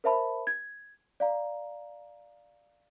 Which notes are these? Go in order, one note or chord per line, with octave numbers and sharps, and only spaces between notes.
A#4 C5 E5 A5 B5
G#6
D5 F5 A#5